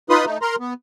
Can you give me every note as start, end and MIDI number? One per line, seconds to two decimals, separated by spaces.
0.10 0.25 63
0.10 0.25 65
0.10 0.25 71
0.10 0.25 83
0.10 0.25 84
0.10 0.25 87
0.25 0.38 57
0.25 0.38 63
0.42 0.56 70
0.42 0.56 82
0.42 0.56 84
0.60 0.73 59